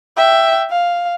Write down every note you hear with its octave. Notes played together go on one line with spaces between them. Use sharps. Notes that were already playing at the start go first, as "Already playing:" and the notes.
E5 G5
F5